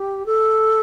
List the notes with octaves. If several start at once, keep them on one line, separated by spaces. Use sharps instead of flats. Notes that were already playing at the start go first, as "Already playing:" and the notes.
Already playing: G4
A4